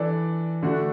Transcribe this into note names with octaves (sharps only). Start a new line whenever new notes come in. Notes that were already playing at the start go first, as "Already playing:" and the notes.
Already playing: E3 D4 A4 D5
D3 A3 D4 F#4